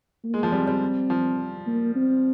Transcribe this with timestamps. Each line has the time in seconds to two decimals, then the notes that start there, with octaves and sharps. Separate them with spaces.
0.24 A#3
0.34 G#3
0.43 F3
0.52 G3 C4
0.68 G3
1.10 F3
1.67 A#3
1.95 C4